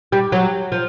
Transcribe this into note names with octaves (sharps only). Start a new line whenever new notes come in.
G3
F#3
F3